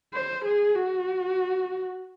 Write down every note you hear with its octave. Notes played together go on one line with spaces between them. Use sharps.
C5
G#4
F#4